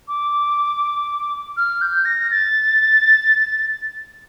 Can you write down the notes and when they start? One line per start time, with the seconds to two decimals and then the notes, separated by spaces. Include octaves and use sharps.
0.08 D6
1.57 F6
1.82 G6
2.05 A#6
2.31 A6